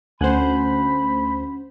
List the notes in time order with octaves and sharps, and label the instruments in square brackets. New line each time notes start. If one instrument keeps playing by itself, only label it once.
[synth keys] D2 C5 [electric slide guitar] C#4 F#5 G#5 [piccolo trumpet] B5